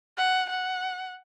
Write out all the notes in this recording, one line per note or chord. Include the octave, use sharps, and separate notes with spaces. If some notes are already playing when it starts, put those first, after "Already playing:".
F#5
F#5